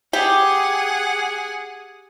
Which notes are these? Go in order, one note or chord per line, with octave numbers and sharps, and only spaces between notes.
G4 G#4 F#5